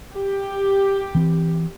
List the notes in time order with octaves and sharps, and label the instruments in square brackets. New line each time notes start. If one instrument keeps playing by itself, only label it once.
[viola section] G4
[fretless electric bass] E3 C4